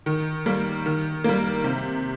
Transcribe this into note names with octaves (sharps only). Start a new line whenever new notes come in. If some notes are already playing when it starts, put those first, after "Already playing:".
D#3
G3 A#3
D#3
G3 A#3
C3